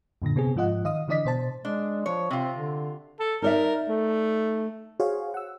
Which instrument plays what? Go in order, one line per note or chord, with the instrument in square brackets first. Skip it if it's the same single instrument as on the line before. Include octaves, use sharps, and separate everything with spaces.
[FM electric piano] F#2 A#2 D3 A#6
C3 B3 C4 G#4
G#2 F3 F4 D#5 F#5
D#3 D#5 F5 D#6
D3 E3 D4 D5 D#5 B6
B2 C5 A5
[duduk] G#3 [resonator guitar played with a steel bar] D4
[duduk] F3 [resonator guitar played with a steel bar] C#5
[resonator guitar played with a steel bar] C3 F4 [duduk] C4
[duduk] D3
[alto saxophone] A4
[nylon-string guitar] D#4 D5 E5 [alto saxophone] A#4
[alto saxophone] A3
[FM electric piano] F#4 G#4 C5 C#5 F5
F#5 E6